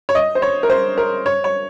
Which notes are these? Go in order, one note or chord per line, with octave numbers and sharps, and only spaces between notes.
C#5
D#5
C5
C#5
A#4
C5
A#4
C#5
C#5